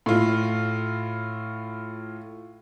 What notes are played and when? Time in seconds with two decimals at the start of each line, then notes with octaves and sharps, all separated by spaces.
0.06 A2 F4